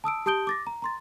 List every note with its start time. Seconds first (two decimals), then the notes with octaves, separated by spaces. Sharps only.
0.04 A5 D#6 E6 D7
0.26 G4 A5 D#6 G6 D7 G7
0.47 D6 A6 A#6
0.67 A#5
0.82 A#5 C6 A6